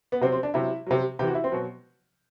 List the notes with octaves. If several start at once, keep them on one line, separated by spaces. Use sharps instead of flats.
B3
C3 F#3 C4
C4
D4
C3 F#3 E4
C3 F#3
C3 E3 G4
F#4
E4
C4
B2 F#3